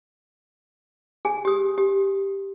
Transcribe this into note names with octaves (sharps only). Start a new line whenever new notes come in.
G#4 G#5
G4 D#6
G4